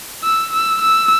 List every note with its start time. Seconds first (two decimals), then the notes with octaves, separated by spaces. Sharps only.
0.23 E6
0.53 E6
0.82 E6